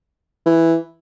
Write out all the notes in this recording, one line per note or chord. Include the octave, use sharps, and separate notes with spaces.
E3